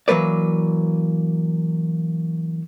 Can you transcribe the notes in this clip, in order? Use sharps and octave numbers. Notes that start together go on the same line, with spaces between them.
E3 F#3 A#3 B4 D5